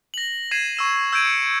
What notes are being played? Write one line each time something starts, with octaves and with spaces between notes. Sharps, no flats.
A#6 F#7
G#6 C7 D#7 E7
C#6 E6 E7
E6 G6 G#6 D7 D#7
C#7